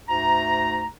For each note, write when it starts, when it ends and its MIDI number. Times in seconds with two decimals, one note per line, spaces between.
0.08 0.87 38
0.08 0.87 44
0.08 0.87 57
0.08 0.87 82